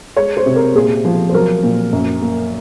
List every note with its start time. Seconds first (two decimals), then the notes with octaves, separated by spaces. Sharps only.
0.17 G#3 C#5
0.37 C5
0.46 C3
0.56 A#4
0.75 A#2 G#4
1.05 F3
1.29 C5
1.33 F#3 A#4
1.63 A#2
1.93 F#2
2.22 A#3